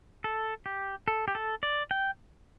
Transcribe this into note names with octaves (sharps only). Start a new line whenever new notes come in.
A4
G4
A4
G4
A4
D5
G5